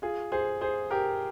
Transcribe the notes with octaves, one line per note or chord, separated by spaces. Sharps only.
F4 G#4
G#4 C5
G#4 C5
G4 A#4